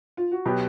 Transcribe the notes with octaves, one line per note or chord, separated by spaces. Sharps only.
F4
F#4
B2 F#3 B3 G4